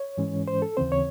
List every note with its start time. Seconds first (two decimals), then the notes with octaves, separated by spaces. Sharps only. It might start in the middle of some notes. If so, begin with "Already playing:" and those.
Already playing: C#5
0.18 G#2 E3 G#3 C#4
0.48 C5
0.62 A4
0.77 D#2 C#3 E3 C4 C5
0.92 C#5